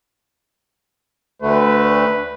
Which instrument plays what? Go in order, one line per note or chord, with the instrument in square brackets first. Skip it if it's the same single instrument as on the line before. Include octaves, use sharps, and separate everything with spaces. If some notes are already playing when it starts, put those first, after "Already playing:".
[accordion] D2 D3 A3 [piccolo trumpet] B4